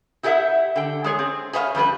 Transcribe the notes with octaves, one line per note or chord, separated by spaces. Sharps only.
E4 G4 A4 D#5 E5 F#5
D3 G5
G#3 G#4 C#5
C4
G#4 B4 C#5 E5 F5
F2 G3 E4 B4